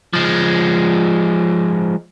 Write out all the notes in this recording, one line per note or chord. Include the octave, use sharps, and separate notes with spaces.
F3 G#3